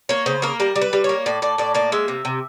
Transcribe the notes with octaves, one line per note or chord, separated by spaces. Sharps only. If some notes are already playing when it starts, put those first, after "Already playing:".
A#3 C#5
C#3 C5
A#3 A#4
G3 A#4
G3
B4
G3
A#3 C#5
A2 D5
A2 D5
A2 D5
A#3 D5
G#3 E5
C3
C3